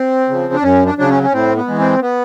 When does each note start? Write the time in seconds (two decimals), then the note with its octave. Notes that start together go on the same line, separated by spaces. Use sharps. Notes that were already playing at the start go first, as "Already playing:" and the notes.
Already playing: C4
0.29 C#3 F3
0.54 D4
0.63 F#2 C#4
0.86 D4
0.98 C#3 F#3 D4
1.10 C#4
1.23 C#4
1.33 A2 C4
1.56 B3
1.68 E3 G#3
1.79 C4
2.02 B3